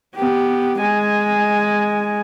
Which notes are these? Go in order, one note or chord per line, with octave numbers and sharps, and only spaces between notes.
B3 G4
G#3 G#5